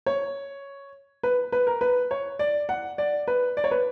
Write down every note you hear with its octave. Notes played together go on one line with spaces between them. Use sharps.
C#5
B4
B4
A#4
B4
C#5
D5
F#5
D5
B4
D5
C#5
B4